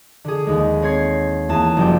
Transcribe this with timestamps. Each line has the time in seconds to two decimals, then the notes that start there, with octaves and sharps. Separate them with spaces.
0.25 D3 G#4
0.47 D#2 G#3
0.82 C4 C#5 G#6 C7
1.49 E2 A#3 G#5 A5
1.77 F#1 F3 G3 G5